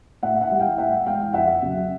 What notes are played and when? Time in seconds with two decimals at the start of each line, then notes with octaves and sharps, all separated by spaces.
0.23 A2 E5 F#5
0.41 E5 F#5
0.51 E3 G3
0.60 F5 G5
0.78 A2 E5 F#5
1.06 E3 G#3 F5 G5
1.33 F2 E5 F#5
1.62 C#3 F#3